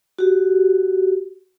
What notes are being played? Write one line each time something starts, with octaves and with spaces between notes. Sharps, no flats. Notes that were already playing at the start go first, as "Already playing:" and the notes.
F#4 G4